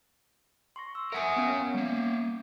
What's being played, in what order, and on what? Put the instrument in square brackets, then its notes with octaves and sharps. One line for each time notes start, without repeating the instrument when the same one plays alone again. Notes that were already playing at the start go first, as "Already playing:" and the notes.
[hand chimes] C6 C#6 A#6
E6
[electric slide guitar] A#4 F#5 G#5 [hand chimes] E5 D#6
[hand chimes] B3 C#4 F5
[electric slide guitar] G3 A#3